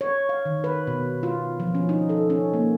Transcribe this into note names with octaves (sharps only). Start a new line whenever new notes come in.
C#5
F5
D#3
B4
B2
F4
F3
C#4
D#4
A4
C#4
A#3